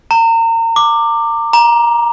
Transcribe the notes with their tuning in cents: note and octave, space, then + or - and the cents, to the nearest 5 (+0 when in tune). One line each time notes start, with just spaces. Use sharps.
A#5 -35
D6 +10
A#5 +15